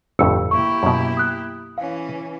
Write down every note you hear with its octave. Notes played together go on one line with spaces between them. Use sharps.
G1 F2 A2 E6 C#7
A#3 E4 G4 C#6
F#2 B2
D#6 F#6
E3 C#4 F5